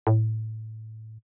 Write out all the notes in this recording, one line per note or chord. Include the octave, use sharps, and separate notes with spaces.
A2